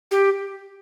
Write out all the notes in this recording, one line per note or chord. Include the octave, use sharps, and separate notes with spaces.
G4